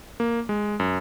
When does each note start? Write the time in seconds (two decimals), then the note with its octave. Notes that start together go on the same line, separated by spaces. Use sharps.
0.20 A#3
0.49 G#3
0.80 F#2